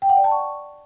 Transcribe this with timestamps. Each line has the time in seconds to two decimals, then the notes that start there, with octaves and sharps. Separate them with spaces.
0.02 G5
0.09 F#5
0.17 D5
0.24 A5
0.32 C#6